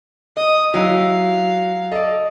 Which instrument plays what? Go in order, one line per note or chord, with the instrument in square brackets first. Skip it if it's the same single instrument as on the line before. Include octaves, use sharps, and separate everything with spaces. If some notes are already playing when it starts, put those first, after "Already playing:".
[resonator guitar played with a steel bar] D#5 [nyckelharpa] D#6
[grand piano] F#3 [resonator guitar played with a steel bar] G#3 E4 G4 [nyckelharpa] F5
[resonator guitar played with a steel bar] A4 D5 [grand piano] D#5